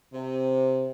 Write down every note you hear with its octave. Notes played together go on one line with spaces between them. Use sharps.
C3